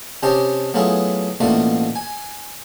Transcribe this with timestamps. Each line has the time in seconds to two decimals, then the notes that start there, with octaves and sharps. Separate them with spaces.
0.23 C3 C#4 G4 D#5 A5 C6
0.74 F#3 A3 B3 E4 F4 G#4
1.40 A1 B2 A3 A#3 F4 D5
1.96 G#5